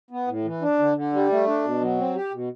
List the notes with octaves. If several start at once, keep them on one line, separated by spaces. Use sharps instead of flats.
B3
A2
E3
D4
D3
D3
G3
A3
D4
B2
F#3
C4
G4
B2